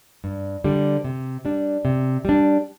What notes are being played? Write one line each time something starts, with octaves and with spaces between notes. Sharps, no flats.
G2
D3 G3
C3
G3 D4
C3
G3 D4